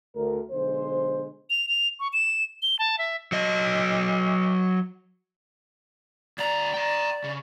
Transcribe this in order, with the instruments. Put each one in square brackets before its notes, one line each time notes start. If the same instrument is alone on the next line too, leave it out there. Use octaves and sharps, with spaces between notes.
[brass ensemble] D2 A#4
B1 D3 G#3 C5
[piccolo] F7
F7
C#6
E7
G7
A5
E5
[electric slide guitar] F#3 D#5
[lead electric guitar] D2 A#5 [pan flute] D5
[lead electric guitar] G5 A#5
C#3